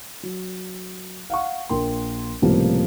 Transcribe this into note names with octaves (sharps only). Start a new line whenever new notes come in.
F#3
F5 F#5 C#6
A#1 A#3 A#4 G5 C6
C#2 A2 C3 F3 G3 A#3